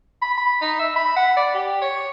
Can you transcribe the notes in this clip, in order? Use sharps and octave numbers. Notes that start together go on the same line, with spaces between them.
B5
B5
D#4
E5
B5
F#5
D5
G4
C#5